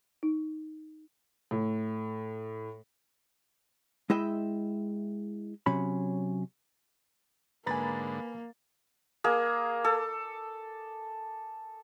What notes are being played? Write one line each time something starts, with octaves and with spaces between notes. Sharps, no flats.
D#4
A2
G#3 E4 D#5 E5 G5
C3 F#3 C#4 B5
G#2 D3 A#3 B4 G#5 A#5 B5 A6
A#3 G#4
A4